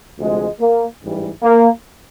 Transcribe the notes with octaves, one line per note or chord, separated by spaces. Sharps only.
D2 C3 F3 G#3
A#3
A1 G#2 E3 G3
A#3